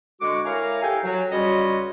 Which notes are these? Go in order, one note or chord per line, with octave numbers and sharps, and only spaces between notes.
D3 G#3 F#4 C#6 D6
E4 A#4 C#5 F5 G#5 A#5
G4 A4 G5 G#5
F#3
C#2 G3 F4 F#4 C#5 D#5